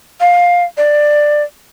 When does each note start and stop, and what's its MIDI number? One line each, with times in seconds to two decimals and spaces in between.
0.20 0.64 77
0.77 1.43 74